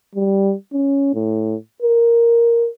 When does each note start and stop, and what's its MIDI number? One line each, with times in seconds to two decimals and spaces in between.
0.15 0.53 55
0.73 1.13 61
1.14 1.55 45
1.82 2.68 70